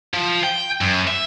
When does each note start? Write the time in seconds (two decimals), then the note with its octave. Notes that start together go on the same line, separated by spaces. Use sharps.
0.14 F3
0.44 G5
0.81 F#2
1.08 E5